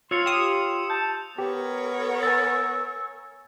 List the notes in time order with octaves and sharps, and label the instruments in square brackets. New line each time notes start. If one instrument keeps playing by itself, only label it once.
[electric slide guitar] F4 C#5 [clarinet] C6 [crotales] E6 C#7 F7
[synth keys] G4 D#6 [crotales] E7
[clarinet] A5 [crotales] G6
[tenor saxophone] B3 [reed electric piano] G4 [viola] A#4 C#5
[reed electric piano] G#5 A6 [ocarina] E6